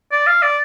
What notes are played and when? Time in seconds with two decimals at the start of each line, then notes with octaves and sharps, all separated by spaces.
0.12 D5
0.27 F5
0.42 D5